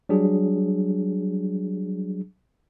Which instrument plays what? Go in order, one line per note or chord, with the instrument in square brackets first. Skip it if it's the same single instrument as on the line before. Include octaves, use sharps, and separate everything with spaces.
[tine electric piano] F#3 G3 D4 G#4